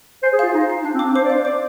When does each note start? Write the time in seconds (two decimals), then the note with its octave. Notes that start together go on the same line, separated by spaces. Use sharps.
0.23 C5 G#5
0.33 G#4
0.39 F4 F5
0.54 D#4 F5
0.70 F5
0.85 D4 F5
0.95 C4
0.99 D4 D6
1.15 C5 D6
1.25 D5
1.30 F5
1.35 C5
1.45 D5 D6